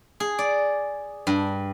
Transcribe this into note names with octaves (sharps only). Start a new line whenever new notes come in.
G#4
D5
G2